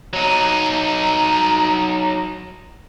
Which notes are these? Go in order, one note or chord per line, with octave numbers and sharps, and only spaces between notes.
F#3 D#4